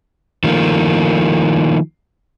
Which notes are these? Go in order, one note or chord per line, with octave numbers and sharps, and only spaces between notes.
D#3 F3 A3 A#3